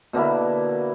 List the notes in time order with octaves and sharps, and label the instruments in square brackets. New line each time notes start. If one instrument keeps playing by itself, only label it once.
[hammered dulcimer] B2 D3 A#3 E4